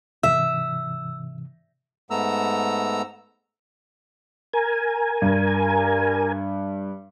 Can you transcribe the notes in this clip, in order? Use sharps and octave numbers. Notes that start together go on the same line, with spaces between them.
G#2 C3 E3 E5 E6
G#2 A3 B3 A#5 E6
A#4 G#5
G2